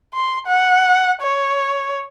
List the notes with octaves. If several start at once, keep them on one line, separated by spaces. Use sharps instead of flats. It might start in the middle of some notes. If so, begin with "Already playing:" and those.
C6
F#5
C#5